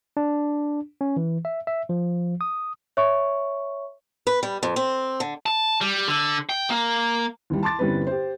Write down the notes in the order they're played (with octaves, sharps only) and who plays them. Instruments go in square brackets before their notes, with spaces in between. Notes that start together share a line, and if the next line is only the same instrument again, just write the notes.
[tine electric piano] D4
C#4
E3
E5
E5
F3
D#6
[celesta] C#5 E5 C#6
[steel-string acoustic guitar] B4
G3
F2
C4
D3
[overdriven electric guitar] A5
G3
D3
G5
A#3
[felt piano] D#2 E3 G3
A5 C6 D6 A6
G1 E2 G3 C4 C#4 B4
G4 C5